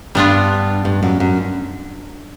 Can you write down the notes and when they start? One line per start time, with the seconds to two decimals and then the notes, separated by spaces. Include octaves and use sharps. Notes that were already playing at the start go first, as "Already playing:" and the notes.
0.15 G2 G3 B3 D4 F4
0.85 G2
1.03 F#2
1.20 F#2